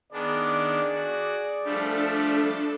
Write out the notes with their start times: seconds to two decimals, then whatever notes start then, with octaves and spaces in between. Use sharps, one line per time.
0.12 D#3 B3 D4 G#4 D5
0.93 F#4
1.64 F3 G3 A3 D4 A4